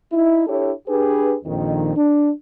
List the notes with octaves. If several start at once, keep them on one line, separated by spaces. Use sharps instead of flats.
D#4 E4
D4 E4 G4 A4 C#5
D4 G4 G#4 B4
A#1 F2 D#3
D4